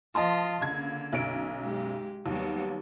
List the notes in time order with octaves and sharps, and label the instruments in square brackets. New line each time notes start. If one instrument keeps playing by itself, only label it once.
[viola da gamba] F3 F4 [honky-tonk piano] D#5 A5 C6
[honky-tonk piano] C#2 G#6 [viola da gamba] D3 A#3
[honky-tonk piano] B1 F#2 D7
[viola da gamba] G#3 G4
[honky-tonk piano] D#2 [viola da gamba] F#3 G3 B3